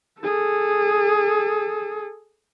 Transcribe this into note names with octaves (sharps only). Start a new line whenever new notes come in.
G#4 A4